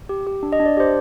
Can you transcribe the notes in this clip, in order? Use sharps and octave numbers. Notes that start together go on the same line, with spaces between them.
G4
G4
D4
D#5
D4
D5
G4 C5